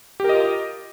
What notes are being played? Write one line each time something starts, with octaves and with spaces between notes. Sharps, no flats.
F4 G4 A#4 D#5